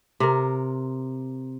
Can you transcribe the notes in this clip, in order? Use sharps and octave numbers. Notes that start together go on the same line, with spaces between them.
C3 A#4